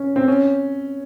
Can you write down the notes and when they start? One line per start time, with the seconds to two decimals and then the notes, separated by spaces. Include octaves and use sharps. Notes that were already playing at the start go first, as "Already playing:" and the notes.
Already playing: C#4
0.16 C4
0.28 C#4